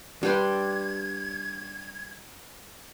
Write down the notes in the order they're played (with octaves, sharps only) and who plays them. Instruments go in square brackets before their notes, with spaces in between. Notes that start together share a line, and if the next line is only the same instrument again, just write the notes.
[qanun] G3 G5 C6 [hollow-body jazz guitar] D4 B4 [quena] G#6